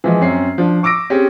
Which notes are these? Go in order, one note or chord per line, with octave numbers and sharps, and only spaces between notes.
E3 F3 G#3
F#2 C4 C#4 C7
F3 D4
C#6 D6 E6 A#6 D7
C4 C#4 G4 G#4